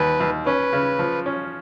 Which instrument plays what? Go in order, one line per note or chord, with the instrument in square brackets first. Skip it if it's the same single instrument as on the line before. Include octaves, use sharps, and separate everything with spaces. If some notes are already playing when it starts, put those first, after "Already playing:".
Already playing: [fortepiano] D#2 [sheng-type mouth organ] B4
[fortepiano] D#2
[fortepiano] C#4 [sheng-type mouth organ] B4
[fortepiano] C#3
F3
C#4